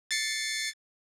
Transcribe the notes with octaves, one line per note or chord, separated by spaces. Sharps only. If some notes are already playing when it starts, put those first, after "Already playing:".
A6 C7 C#7